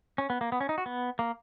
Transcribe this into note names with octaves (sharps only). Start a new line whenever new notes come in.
C#4
B3
A#3
B3
C#4
D#4
F#4
B3
A#3